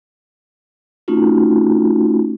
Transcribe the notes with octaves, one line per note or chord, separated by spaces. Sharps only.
A3 C4 C#4 D#4 F4 F#4